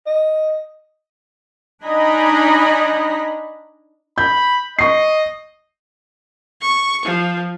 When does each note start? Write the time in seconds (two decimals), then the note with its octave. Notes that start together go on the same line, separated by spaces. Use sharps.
0.06 D#5
1.85 D4 D#4 D#5 G#5 A#5 B5
4.18 B5 G6
4.79 D#5 C#6 C7
6.62 C#6
7.05 F3